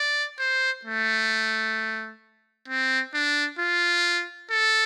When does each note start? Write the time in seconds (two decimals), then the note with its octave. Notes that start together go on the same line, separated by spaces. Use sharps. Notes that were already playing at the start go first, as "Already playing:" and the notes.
Already playing: D5
0.39 C5
0.85 A3
2.68 C4
3.14 D4
3.59 F4
4.51 A4